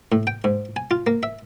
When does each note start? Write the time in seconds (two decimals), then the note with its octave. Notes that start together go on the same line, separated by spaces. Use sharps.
0.12 A2
0.27 G5
0.44 G#2
0.76 G#5
0.91 F4
1.07 A#3
1.23 E5